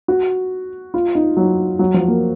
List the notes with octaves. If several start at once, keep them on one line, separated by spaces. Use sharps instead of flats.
F#4
F4
D#4
F#3
F#3
F3
A#3